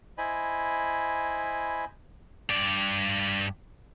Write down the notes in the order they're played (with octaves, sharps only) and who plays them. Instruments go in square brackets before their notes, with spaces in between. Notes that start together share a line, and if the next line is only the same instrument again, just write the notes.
[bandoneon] E4 C5 D#5 G#5 B5
[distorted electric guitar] G2 D5